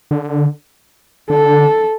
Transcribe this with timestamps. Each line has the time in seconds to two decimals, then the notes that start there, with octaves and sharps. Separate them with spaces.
0.11 D3
1.30 D3 A4